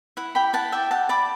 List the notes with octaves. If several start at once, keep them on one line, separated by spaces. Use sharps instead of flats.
E4 F#5
G4 G5 B5
E4 F#5 A5
D5 E5 G5
G4 F#5 A5
D5 B5 D6